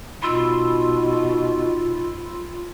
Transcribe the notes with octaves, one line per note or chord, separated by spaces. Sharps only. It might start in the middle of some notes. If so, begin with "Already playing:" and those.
B2 D#4 F4 B5 C6 E6